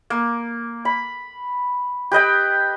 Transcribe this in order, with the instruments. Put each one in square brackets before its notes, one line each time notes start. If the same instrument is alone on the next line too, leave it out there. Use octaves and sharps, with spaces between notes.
[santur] A#3
B5
G4 B4 D#5 G5